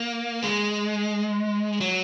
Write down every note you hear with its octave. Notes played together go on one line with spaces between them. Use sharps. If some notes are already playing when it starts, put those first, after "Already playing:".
Already playing: A#3
G#3
F#3